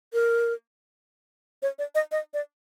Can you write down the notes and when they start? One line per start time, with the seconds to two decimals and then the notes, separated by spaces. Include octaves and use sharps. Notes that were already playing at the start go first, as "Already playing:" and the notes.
0.13 A#4
1.62 C#5
1.79 D5
1.95 D#5
2.12 D#5
2.34 D5